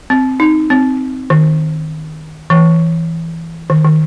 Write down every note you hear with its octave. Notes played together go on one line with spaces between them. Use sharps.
C4
D#4
C4
D#3
E3
D#3
D#3